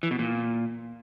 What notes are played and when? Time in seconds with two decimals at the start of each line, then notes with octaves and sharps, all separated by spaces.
0.03 E3
0.11 B2
0.19 A#2